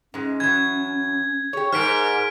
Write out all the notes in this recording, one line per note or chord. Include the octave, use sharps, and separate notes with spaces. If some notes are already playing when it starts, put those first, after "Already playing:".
G#2 G#3 C#4
E3 F#3 G#6
G4 G#4 C#5
G#2 A#4 C5 F6 B6 D7